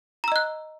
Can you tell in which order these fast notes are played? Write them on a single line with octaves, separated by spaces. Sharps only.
A#5 E6 D#5 F#6